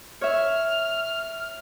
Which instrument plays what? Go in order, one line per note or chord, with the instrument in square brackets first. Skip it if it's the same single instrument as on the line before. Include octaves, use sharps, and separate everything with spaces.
[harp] C#5 E5 [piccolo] F6